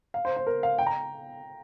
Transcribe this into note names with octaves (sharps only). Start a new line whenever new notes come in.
F5
C5
C5
A#4
F5
G5
A#5